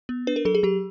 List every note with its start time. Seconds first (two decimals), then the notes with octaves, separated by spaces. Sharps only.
0.09 B3
0.27 D4 B4
0.36 A#4
0.45 F#3 A4
0.55 G#4
0.63 F#3 G4